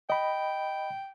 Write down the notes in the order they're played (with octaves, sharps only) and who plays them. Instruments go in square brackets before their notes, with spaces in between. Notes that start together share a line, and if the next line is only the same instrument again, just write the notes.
[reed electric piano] D#5 B5 [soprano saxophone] G5